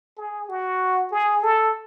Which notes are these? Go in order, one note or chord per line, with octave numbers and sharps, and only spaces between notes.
G#4
F#4
G#4
A4